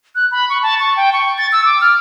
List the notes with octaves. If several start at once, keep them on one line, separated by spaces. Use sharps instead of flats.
F#6
B5
C#6
A5
C#6
G5
C#6
A6
E6
D6
F6